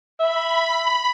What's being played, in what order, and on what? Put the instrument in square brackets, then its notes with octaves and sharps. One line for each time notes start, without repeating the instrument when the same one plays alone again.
[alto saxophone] E5 [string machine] B5